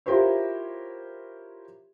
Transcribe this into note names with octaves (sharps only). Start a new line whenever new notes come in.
E4 F4 G4 A#4 C5 C#5